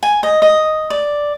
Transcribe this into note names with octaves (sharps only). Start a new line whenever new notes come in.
G#5
D#5
D#5
D5